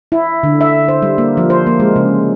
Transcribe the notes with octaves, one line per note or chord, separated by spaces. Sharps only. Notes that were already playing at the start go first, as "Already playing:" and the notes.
E4
D3
E5
C5
G3
A#3
F3
C5
A#3
G#3
C#3